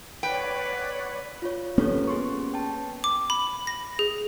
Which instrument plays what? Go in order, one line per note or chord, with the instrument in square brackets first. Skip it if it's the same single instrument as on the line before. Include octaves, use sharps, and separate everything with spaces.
[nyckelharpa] B4 [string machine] C#5 D5 F#5 [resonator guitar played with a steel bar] G5
[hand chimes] F4 C#5
[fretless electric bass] A#3 B3 C#4 [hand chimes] G4 A4 C#5
[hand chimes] G#4 C6 C#6
G5 A5
[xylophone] D6
B5
A#6
G#4